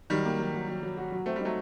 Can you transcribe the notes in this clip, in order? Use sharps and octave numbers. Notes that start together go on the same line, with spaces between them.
D#3 F#3 G3
A#3
F#3
F#3
F#3
F#3
F#4
F#3
A3 C4
G3
F#3 A3 D#4